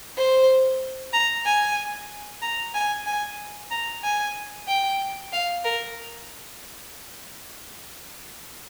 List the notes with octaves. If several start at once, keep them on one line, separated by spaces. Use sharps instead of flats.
C5
A#5
G#5
A#5
G#5
G#5
A#5
G#5
G5
F5
A#4